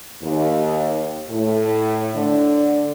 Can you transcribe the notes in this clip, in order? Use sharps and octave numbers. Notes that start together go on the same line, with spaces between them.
D#2
A2
D3